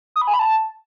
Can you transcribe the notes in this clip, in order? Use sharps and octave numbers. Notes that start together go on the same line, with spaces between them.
D#6
B5
G#5
B5
A5